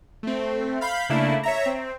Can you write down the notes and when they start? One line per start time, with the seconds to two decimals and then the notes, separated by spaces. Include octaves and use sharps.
0.23 A3 C4
0.81 F5 B5 G6
1.09 C#3 A3 A#3 D4 E4
1.43 C#5 E5 A#5
1.66 C4